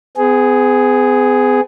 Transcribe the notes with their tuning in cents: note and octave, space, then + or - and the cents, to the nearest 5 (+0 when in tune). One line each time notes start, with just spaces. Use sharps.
B3 +45 G#4 +0